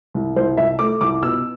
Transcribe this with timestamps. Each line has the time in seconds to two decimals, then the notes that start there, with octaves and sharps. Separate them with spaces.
0.14 C2
0.36 C2 C5
0.57 C2 E5
0.79 A3 D6
1.01 C2 D6
1.22 B2 E6